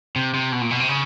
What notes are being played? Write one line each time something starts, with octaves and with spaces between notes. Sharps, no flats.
C3
C3
B2
A#2
B2
C3
C#3